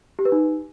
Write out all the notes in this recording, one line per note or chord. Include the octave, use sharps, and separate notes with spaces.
G4
B4
D#4